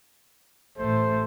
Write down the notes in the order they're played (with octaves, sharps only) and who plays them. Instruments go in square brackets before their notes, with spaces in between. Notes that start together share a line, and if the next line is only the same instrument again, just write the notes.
[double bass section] A1 [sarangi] A3 [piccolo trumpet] C5